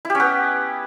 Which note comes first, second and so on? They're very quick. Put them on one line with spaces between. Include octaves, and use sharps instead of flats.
E4 G4 C#4 B3